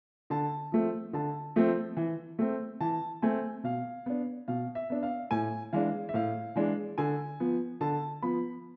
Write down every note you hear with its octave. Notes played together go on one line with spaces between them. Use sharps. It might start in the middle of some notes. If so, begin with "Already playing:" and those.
D3 A5
F3 A3 C4
D3 A5
F3 A3 C4
E3
A3 C4
E3 A5
A3 C4 G#5
B2 F5
B3 D4
B2 F5
E5
B3 D4
F5
A2 G#5
E3 G#3 D4 F5
E5
A2 F5
E3 G#3 D4
D3 G#5
F3 B3
D3 A5
F3 B3 B5